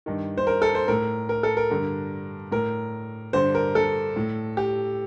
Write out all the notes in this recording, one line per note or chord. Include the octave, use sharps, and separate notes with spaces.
G2 D#3
C5
A#4
A4
C5
A2 A#4
A#4
A4
A#4
G2 D3
A2 A#4
G2 D3 C5
A#4
A4
A2
G4